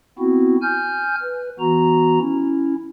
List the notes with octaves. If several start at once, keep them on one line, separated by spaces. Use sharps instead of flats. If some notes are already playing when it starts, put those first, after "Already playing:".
B3 C4 E4 F#4
G#5 F6 G6
B4
E3 B3 F#4 A#5
C#4 E4